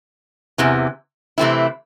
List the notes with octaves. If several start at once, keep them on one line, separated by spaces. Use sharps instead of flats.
E2 C3 E3
C3 E3 A3 C4 E4